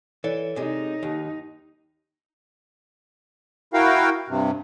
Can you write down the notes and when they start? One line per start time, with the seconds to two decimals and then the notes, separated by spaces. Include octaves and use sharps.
0.24 E3 A4 C#5 D5
0.56 C3 G#3 D#4
1.03 D#2
3.74 E4 F#4 A#4 F5 G5
4.28 G2 C3